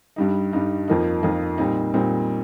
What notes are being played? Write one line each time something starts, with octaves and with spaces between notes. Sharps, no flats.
G2 G3 D#4
G2 G3 D#4
F2 F3 A#3 D#4
F2 F3 A#3 D#4
A#2 G3 C4 D#4
A#2 G3 C4 D#4